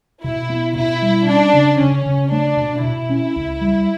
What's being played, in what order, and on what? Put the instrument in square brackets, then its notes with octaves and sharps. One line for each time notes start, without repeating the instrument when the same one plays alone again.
[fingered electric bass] B2 [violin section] E4
[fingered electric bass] B3
[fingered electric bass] B2 [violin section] E4
[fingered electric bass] G3
[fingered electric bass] C#4 [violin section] D4
[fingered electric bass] C#3
[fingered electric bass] C#3 [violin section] C#4
[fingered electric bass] C#3
[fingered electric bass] A3 [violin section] D4
[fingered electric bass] B2
[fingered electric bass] B2 [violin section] E4
[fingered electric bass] C#4
C#2
G3